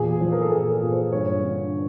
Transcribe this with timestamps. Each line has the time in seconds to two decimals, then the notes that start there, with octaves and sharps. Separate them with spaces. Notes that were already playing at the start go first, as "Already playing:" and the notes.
Already playing: E2 A#2 G#4
0.21 F3
0.32 A#4
0.42 A4
0.51 A#2 G#4
0.72 G#4
0.82 A#2
0.92 C5
1.12 G2 C#5
1.43 D3